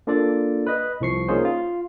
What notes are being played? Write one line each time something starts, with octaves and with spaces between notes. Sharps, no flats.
A#3 D4 F4 A4 D5
B4 D#5
C2 F3 C#6 C7
A#3 C#4 D#4 F4 G#4 C5
F4